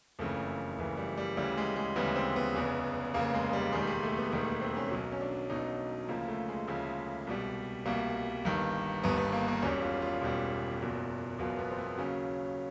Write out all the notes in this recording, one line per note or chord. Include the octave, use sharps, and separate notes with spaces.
F#1 F2 C#3 E3 A3
F#1 F2 C#3 E3
G3
G3
D2 C#3 E3 G3
G#3
G#3
D2 C#3 E3 G3 B3
C4
B3
F1 E2 C#3
F1 E2 C#3 A#3
G#3
G3
E1 D#2 D#3 G3 G#3
G#3
A3
B3
E1 D#2 D#3 G3
B3
C4
C#4
B1 B2 F#3
C#4
D4
B1 B2 F#3 D#4
D2 C#3 F3 A#3
A3
G#3
D2 C#3 F3
C2 B2 G3
C2 B2 G3 A#3
G1 G2 D#3
G1 G2 D#3 B3
B3
A#3
A#3
E1 E2 B2 G3 C#4
F4
F4
E1 E2 B2 G3
F#1 E2 B2 F#3
F#1 E2 B2 F#3 F4
B3
C4
B3
D#2 C#3 F#3 C#4